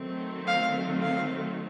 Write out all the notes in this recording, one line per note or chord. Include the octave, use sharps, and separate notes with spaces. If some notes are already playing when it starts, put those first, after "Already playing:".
Already playing: D#3 F#3 A3 C4
F5
F5